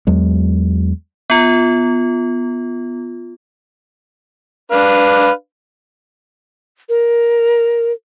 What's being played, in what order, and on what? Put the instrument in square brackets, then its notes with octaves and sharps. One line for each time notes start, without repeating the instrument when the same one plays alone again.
[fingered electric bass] E2 F#3 G#3
[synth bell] B3 F4
[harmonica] D4 B4 F5
[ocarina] A#4